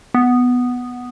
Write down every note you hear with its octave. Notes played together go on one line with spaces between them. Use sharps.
B3